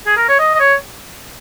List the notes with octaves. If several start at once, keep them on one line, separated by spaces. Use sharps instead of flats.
G#4
A#4
C#5
D#5
D#5
C#5